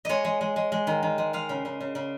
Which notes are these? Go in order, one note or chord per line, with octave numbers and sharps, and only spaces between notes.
G#3 C#5 D#5
G#3
G#3
G#3
G#3
D#3
D#3
G#3
G#3 F5
C#3
C#3
C#3
C#3